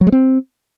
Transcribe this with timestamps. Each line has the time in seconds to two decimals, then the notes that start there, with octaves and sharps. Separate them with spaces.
0.01 F#3
0.07 G#3
0.12 C4